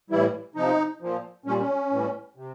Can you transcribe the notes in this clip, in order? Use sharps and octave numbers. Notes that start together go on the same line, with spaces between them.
A2 E3 G3 E4
C3 F3 D#4
A#2 F3
A#2 G3 C#4
C#4
A2 E3 G3
C3